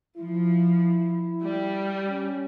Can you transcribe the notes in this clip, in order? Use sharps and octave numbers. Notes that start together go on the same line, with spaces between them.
F3 E4
G3
C#4